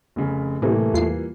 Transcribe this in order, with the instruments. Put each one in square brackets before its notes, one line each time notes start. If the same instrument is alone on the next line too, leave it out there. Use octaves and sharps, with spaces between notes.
[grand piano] F1 C#3
[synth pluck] A2 C3 [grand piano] E3 G3 A#3 [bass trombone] A3
[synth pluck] E2 F4 C7